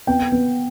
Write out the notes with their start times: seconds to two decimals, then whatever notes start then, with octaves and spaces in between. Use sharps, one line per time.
0.07 B3 G5
0.32 B3